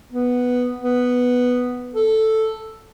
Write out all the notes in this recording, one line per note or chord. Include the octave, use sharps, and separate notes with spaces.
B3
B3
A4